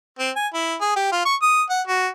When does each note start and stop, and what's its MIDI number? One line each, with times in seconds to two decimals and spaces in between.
0.19 0.30 60
0.36 0.47 80
0.54 0.75 64
0.81 0.95 68
0.96 1.11 67
1.12 1.25 65
1.25 1.35 85
1.42 1.62 87
1.70 1.81 78
1.87 2.08 66